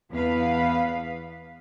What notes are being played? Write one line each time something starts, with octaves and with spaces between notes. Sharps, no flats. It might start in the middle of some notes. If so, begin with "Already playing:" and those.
E2 B3 B4 F5